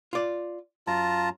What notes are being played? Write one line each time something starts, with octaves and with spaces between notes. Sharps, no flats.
F4 D5
F#2 F4 A5 A#5